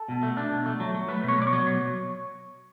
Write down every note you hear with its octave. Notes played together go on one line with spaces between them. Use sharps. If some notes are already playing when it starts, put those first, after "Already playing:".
Already playing: A4
B2
A3
D4
B2
A3
F#3
F#3
A3 B4
B2
C#5
B2 D5
C#5
F#3
B2